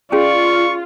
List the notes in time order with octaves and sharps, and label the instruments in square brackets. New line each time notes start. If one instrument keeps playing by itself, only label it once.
[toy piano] C#4 G#4 [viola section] F4 [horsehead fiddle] D5 [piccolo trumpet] C#6